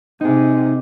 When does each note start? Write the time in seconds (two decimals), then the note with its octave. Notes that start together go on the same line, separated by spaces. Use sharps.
0.21 C3 D#4 G#4